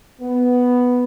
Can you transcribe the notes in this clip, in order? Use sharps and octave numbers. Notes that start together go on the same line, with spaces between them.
B3